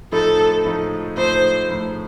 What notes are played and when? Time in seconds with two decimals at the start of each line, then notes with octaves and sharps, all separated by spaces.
0.12 A2 F3 A3 D#4 A4
0.65 A2 F3 A3 D#4
1.17 A2 F3 A3 D#4 C5
1.69 A2 F3 A3 D#4